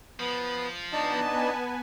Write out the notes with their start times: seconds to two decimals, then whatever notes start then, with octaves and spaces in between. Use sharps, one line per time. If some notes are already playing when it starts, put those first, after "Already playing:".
0.20 F3 B3 D#6
0.93 B3 D4 D#4 B4 D#5 G#5 A5